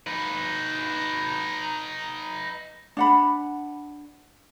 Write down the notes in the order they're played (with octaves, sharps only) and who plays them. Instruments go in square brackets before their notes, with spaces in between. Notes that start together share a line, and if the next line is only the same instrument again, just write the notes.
[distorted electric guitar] D#4 B4
[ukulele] D4 F#5 B5